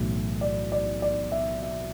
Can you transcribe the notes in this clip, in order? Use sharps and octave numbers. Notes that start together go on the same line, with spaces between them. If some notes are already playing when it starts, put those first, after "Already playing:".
Already playing: B1 A2 E3
D5
D5
D5
E5
E5